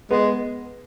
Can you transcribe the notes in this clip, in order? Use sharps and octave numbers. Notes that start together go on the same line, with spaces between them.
G#3 B3